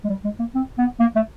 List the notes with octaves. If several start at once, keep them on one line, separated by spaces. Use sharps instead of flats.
G#3
G3
G#3
A#3
C4
B3
A#3
A3